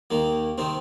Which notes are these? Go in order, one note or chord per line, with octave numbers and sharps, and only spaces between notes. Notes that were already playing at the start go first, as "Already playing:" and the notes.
D#2 D#3 A#3
C3 D#3 C4